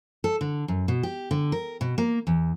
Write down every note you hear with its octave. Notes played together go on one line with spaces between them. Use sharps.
A4
D3
F#2
B2
G4
D3
A#4
B2
A#3
E2